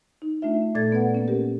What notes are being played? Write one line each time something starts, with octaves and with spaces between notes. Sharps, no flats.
D#4
A3 D4 F4 E5
A#2 A3 A4 D5 G#6 A6
B3 B4 D5 F#5
A#3 C#4
G4 A#4